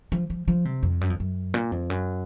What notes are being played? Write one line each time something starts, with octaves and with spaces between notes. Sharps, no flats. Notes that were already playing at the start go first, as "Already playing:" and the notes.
F3
F3
F3
C3
F2
F#2
F2
F#2
A#2
F2
F#2